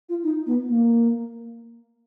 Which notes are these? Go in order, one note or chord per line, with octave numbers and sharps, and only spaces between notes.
F4
D#4
B3
A#3